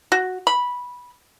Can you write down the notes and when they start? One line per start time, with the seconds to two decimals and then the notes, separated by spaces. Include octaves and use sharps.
0.12 F#4
0.47 B5